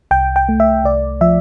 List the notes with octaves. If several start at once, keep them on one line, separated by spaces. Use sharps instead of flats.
C2 G5
G5
A3
E5
C2 D5
F3 E5